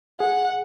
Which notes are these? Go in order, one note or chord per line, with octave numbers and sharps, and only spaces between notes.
G#4 F#5